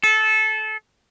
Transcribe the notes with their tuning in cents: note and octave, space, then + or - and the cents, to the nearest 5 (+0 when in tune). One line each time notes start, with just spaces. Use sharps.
A4 -20